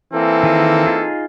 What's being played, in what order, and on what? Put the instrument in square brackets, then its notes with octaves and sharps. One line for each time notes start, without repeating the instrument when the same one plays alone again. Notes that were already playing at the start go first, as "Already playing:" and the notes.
[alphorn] E3 [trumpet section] A#3 C4 A4
[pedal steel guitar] D#3 G#4 D#5
D#4 F4 G#4